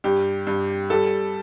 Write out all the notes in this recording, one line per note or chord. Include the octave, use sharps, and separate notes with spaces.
G2 G4
G2
G3 A4